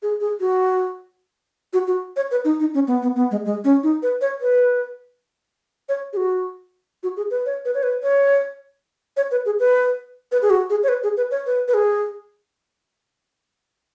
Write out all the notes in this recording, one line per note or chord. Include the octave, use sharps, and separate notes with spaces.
G#4
G#4
F#4
F#4
F#4
C#5
B4
D#4
D#4
C#4
B3
B3
B3
G#3
G#3
C#4
D#4
B4
C#5
B4
C#5
G#4
F#4
F#4
G#4
B4
C#5
B4
C#5
B4
C#5
C#5
B4
G#4
B4
B4
G#4
F#4
G#4
C#5
B4
G#4
B4
C#5
B4
B4
G#4